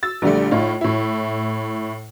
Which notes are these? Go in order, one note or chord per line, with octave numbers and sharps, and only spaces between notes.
E6 A6
A#1 D3 G3 A3
A2 D#4 F4
A2 E4